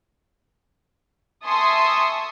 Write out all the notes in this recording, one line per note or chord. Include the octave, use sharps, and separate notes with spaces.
E5 G#5 A5 C6 C#6 D#6